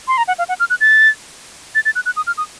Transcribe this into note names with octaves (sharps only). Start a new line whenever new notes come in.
C6
A#5
F#5
F5
F#5
F6
F#6
A6
A6
A6
F#6
F#6
D#6
F6
D#6